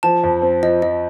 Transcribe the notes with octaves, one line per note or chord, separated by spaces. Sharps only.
F3 A5
F2
C4
F3 D#5
F3 D#5